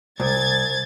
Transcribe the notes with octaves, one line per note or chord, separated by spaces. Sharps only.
C2 G#6 A6